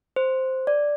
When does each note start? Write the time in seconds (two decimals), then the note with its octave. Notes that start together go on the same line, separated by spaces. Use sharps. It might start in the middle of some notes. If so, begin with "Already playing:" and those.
0.16 C5
0.67 D5